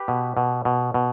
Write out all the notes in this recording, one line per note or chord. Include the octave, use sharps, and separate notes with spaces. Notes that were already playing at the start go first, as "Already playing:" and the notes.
Already playing: G4 B4
B2
B2
B2
B2